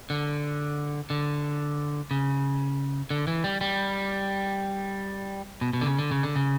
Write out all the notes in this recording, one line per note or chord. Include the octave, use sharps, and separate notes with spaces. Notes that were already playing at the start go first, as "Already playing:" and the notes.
D3
D3
C#3
D3
E3
G3
G3
B2
B2
D3
C#3
D3
C#3
D3
C#3